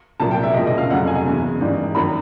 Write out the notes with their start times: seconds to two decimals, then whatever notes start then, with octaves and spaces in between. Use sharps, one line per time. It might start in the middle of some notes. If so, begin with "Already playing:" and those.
0.20 C2 A#2 F#3 A5
0.31 G5
0.43 E5
0.54 E1 D#2 C#3 F3 D#5
0.67 D#5
0.78 F5
0.90 F1 F2 C#3 F#3 F#5
1.07 G#5
1.25 E2 C#3 E3
1.61 G#1 G#2 E3 G3
1.95 F#2 D#3 F#3 B5